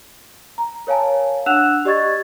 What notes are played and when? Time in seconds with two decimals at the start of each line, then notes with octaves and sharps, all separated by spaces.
0.58 A#5
0.87 A#4 C#5 F5 G#5 A5
1.46 D4 F#5 E6 F#6 E7 F7
1.85 G4 D5 D#5 C#6 G#6 A6